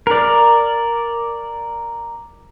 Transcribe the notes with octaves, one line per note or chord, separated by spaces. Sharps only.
A#4 D5